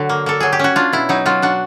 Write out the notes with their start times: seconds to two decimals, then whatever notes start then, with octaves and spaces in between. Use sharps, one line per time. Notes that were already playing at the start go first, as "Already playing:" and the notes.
Already playing: D3 F#3 F#4
0.09 A#3
0.26 A#3 A4
0.40 F#3 G#4
0.53 G4
0.59 C#4 F#4
0.76 D4 F4
0.93 B2 E4
1.09 F#3 D#4
1.26 F#3 F4
1.42 D4 F#4